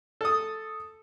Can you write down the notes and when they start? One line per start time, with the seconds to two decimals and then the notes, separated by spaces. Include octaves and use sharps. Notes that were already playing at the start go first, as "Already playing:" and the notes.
0.21 A4 D#6